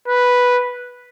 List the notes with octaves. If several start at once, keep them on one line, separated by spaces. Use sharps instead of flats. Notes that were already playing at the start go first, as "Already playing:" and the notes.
B4